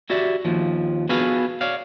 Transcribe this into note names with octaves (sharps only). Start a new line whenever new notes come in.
E4 F#4 G4 D5 E5
D#2 F3
B3 F#4 G#4 A4 B4 F5
C#5 D5 F5